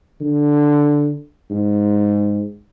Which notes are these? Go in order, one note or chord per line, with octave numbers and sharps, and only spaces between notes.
D3
G#2